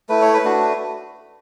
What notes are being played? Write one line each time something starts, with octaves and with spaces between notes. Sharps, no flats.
A3 E4 B4
C#5
B4
A3 D4 F#4